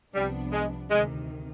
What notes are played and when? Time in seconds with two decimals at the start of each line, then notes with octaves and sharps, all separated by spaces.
0.15 C2 C3 F3 G3 B3 D4
0.52 G#3
0.90 D2 C3 D#3 G#3